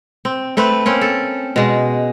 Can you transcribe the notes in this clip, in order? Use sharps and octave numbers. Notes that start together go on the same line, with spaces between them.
C4
A3 C4 B4
A#3 C4 C#4
A4
B2 G#3